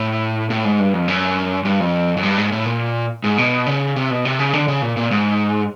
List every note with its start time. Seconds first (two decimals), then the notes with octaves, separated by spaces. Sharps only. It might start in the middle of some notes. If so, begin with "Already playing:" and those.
Already playing: A2
0.50 A2
0.65 G#2
0.79 G2
0.93 F2
1.08 F#2
1.65 G2
1.80 F2
2.17 F#2
2.23 G2
2.38 G#2
2.52 A2
2.66 A#2
3.24 G#2
3.38 B2
3.66 C#3
3.96 C3
4.10 B2
4.25 C3
4.39 C#3
4.53 D3
4.68 C#3
4.82 A#2
4.97 A#2
5.11 G#2